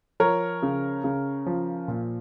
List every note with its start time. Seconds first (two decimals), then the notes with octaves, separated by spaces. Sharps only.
0.20 F3 A#4 C#5
0.63 C#3
1.04 C#3
1.46 F3
1.88 A#2